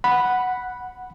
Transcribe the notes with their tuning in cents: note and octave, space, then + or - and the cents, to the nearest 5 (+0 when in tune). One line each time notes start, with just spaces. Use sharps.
F#5 +0 B5 +0